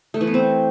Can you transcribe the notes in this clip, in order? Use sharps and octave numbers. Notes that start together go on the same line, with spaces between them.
A3
E3
B3
C4